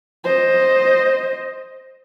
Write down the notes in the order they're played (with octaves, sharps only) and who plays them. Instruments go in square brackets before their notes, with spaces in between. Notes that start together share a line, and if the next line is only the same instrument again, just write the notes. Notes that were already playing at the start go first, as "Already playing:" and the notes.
[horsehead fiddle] C5 D#5